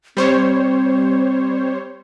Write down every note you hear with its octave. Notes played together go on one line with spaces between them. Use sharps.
G3 C4 C5 C#5